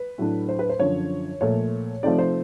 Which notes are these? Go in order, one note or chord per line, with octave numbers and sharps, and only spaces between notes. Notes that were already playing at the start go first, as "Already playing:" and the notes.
Already playing: B4
A2 F#3 A3 D4
C5
B4
C5
F#2 D3 F3 C#5
A#2 F3 A3 C#5
C3 F3 A3 C4 D#4 D5
C5